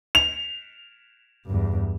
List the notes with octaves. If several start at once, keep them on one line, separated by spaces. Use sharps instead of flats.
F7
E2 G2